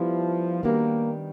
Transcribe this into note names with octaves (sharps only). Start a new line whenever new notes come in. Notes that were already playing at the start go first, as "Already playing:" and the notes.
Already playing: F3 G3 B3 E4
D#3 G3 A#3 B3 D4 F#4